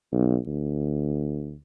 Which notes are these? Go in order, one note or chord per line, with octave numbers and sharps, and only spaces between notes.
B1
D2